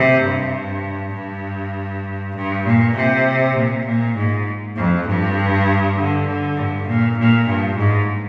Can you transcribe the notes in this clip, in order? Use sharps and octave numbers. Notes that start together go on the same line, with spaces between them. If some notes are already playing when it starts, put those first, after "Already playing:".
Already playing: C3
G2
G2
G2
A#2
C3
A#2
A#2
G#2
F2
G2
D3
D3
G2
A#2
A#2
G2
G#2